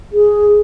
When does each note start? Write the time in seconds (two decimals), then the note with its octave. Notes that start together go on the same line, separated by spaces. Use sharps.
0.12 G#4